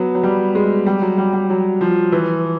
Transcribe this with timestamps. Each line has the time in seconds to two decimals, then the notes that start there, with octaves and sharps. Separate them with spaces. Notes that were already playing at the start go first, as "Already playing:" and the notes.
Already playing: F#3 B3
0.15 F#3
0.23 G3
0.55 G#3
0.86 G3
1.02 F#3
1.18 G3
1.33 G3
1.50 F#3
1.81 F3
2.12 E3